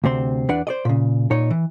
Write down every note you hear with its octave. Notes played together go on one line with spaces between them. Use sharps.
D2 C3 C4 C6
E2 D4 B4 D5 F#5
C5 D5 D#5
A#2 C#3
A#2 D#4 C#5
E3